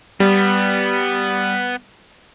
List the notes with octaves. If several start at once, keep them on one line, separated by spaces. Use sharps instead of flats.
G3 B3